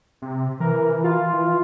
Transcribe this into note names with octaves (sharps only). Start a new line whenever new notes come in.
C3
E3 A#4
F4
E3